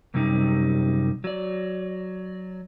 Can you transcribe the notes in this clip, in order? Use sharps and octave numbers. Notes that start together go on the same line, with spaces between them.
F#2 C3 G3 D#4
F#3 D5